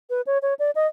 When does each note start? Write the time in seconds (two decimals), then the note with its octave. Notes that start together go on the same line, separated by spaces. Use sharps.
0.10 B4
0.27 C#5
0.42 C#5
0.59 D5
0.75 D#5